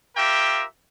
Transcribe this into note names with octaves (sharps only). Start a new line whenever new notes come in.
F4 G4 A#4 E5 G5